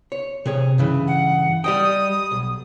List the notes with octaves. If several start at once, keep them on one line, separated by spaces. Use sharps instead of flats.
C#5
C3 G#4 C#5
G2 C#3 E3
F#5
G3 D#5 G5 D#6
B1